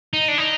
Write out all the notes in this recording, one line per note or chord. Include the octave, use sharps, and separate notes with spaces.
D#4
D4
D#4